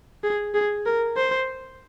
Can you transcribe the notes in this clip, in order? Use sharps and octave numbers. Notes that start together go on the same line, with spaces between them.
G#4
G#4
A#4
C5